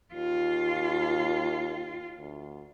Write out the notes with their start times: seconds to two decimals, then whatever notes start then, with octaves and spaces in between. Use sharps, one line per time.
0.14 D#2 F4
2.19 D2